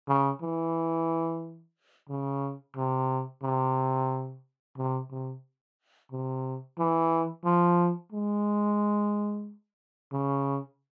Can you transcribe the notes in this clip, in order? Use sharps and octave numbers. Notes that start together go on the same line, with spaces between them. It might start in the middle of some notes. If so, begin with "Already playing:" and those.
C#3
E3
C#3
C3
C3
C3
C3
C3
E3
F3
G#3
C#3